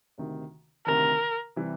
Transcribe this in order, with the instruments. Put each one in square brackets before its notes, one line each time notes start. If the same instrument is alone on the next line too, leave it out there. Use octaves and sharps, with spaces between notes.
[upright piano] D2 C3 D#3
[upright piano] D2 C3 D#3 [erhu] A#4
[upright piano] C3 E3 G3